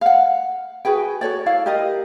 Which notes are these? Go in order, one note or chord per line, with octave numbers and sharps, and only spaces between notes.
F5 F#5
F#4 G#4 B4 G5
F#4 A4 C#5 D5
E4 D5 F5
G4 A#4 D#5